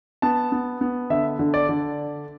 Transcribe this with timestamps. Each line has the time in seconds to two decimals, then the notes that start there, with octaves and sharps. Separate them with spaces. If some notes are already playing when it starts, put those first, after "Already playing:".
0.22 B3 A5
0.52 B3
0.81 B3
1.10 D3 E5
1.39 D3
1.54 D5
1.69 D3